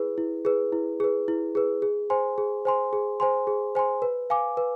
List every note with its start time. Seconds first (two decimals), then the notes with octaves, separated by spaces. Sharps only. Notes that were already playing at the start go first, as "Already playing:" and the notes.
Already playing: E4 G#4 B4
0.18 E4
0.45 G#4 B4
0.72 E4
1.00 G#4 B4
1.28 E4
1.55 G#4 B4
1.82 G#4
2.10 C5 G#5 C6
2.38 G#4
2.65 C5 G#5 C6
2.93 G#4
3.20 C5 G#5 C6
3.47 G#4
3.75 C5 G#5 C6
4.02 B4
4.30 F5 G#5 D6
4.57 B4